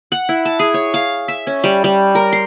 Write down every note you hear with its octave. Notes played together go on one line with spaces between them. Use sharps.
F#5
E4
A5
G#4
C#5
F5
E5
C#4
G3
G3
A#4
C6